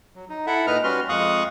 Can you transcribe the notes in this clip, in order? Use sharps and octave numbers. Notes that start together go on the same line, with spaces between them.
F#3
D#4
E4 A4 E5 F#5
A#2 D#4 B4 D#5 A#5 F6
G3 C#4 F#4 B4 C6 F6
F2 G#3 F5 C#6 D#6 F#6